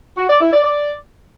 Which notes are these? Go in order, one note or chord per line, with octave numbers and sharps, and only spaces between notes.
F#4
D5
E4
D5
D5